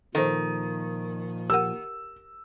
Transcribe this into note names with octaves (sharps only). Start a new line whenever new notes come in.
A#2 D#3 F3 A4 C5
G4 A#4 F#5 E6